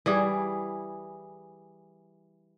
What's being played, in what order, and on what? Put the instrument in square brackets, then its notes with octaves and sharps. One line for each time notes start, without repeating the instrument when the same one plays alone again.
[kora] E3 G3 G#4